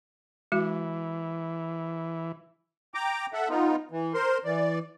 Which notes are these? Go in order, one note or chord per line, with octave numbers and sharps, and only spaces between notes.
E3 G#3 F#4
G5 A#5 D6
A4 E5 F#5
B3 D#4 F4
E3
A#4 C5 C6
E3 D5